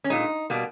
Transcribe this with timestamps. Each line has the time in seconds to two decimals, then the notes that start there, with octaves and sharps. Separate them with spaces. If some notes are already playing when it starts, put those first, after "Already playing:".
0.04 C#4
0.10 A#2 G#3 D#4
0.50 B2 G3 A#3